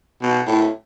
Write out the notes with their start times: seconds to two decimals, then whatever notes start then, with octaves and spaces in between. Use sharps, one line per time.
0.22 B2
0.47 A2